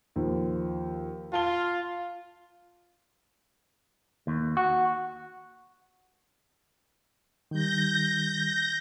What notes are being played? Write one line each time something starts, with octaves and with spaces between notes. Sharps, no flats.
D#2 F3
F4 A5 G7
D#2
F#4
D#3 G3 G6 A#6